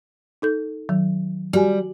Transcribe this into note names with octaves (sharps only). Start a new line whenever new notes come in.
D#4 A4 G6
D#3 F#3
G3 F#4 G4 G#5